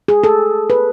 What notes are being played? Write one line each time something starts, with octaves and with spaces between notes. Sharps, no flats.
G#4
A4
B4